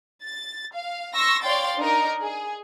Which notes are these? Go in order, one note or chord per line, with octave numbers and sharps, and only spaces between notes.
A6
F5
C6 C#6 E6 A#6
C#5 D5 F5 G5 C6 A6
D4 D#4 A#4
G#4